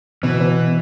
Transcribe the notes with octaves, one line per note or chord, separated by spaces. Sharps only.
B2 E3
B2